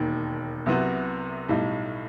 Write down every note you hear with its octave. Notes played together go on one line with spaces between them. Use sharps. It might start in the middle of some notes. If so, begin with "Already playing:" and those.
Already playing: E1 D#2 D#3
C2 C3 F#3 B3 F#4
B1 A2 G3 D#4